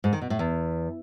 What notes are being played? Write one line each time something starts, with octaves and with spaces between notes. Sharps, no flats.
G#2
D#3
B2
A2
E2